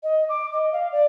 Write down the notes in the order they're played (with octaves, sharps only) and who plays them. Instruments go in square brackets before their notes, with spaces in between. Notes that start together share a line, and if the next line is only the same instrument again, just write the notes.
[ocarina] D#5
D6
D#5
F5
D5